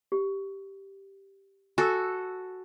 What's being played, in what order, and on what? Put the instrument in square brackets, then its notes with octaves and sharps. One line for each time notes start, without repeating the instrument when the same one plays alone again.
[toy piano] G4
[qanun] F#4 A4 [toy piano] G#5 E6